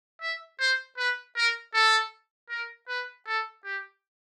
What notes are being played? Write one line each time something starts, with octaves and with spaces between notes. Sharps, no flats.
E5
C5
B4
A#4
A4
A#4
B4
A4
G4